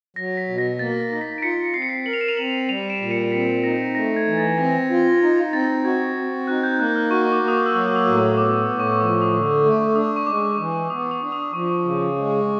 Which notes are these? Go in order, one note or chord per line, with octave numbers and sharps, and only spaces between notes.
F#3 A#6
B6
B2
A#6
A#3 A6
A6
D#4 A#6
B6
D7
F4 B6 C#7
C4 C7
C#7
C7
A#4 F#7
F7
E7
D#7 F7
C4 E7 F#7
G3 D#7 F7
D7 E7
A#2 E7
C#7 D#7
C4 B6
D#4 A#6
A3 A#6
G#6
E3
A6
C4 A#6
F4
D#4
C4 A6
F#4 G#6
C4
D#4 F#6
G6
A#3 F#6
F6
F#4 C#6
D6
A#3
D#6
D6
E6
F#3 D#6
D#6
A2
C#6
B3 D6
A2
C#6
C#6
F3 D6
D#6
D3
D#6
A3
D4 D#6
C#6
G#3 D6
E3 D6
B3 D#6
D#6
D4
D#6
F3 C#6
C#3
G#3